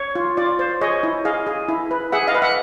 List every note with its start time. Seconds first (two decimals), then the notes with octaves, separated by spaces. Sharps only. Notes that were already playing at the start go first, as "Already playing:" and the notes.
Already playing: C#5
0.15 F4
0.37 F4 D5
0.59 C5
0.81 G#4 C#5 D#5
1.03 E4
1.25 G#4 D#5 F5
1.47 G#4
1.69 E4
1.91 B4
2.12 G#4 E5 F#5
2.27 D#5 F5
2.35 B4
2.42 E5 F#5